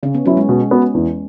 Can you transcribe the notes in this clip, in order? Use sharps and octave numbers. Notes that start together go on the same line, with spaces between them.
C#3 C#4
B3
F#3 C#4 E4
G#3
B2
B3 F#4
E2